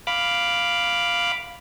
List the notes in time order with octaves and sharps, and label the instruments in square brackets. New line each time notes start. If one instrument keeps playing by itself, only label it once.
[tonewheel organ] F5 B5 D6